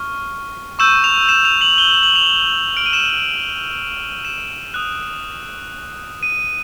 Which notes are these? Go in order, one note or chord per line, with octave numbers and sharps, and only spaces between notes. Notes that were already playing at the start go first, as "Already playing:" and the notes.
Already playing: C#6 F6
C#6 E6 G6 E7
F7
E7
F7
F#7
G7
F#7
F#7
F7
C#6 F6 D7
D#7
E7
E7
E7
D#6 F#6
D#7